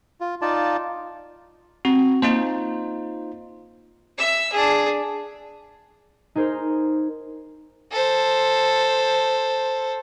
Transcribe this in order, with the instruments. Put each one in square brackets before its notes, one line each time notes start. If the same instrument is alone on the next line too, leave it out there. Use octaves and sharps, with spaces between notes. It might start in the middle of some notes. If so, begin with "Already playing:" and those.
[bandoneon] F4
D#4 F4 D5 A5
[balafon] C4 [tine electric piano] F#4
[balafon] A#3 [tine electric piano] D#4 F4 C5
[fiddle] E5 E6
D4 G#4
[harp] D#4 G#4 A#4 C5
[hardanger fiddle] A4 C5